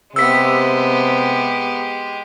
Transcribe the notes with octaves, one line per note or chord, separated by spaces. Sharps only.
C3 G#3 B3 G4 E6 B6